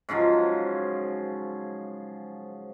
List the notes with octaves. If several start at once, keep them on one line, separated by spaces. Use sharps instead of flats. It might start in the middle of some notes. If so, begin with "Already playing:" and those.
G#2 C#3 F3 F#3